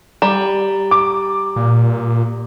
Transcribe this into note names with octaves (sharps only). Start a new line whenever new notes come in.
G3 A#5
D6
A#2